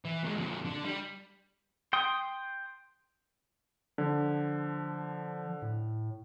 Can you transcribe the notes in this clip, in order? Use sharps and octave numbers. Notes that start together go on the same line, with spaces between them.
E3
D#3 G#3
F2 A#2
D3
G3
G5 C6 D#6
D3 F3
A2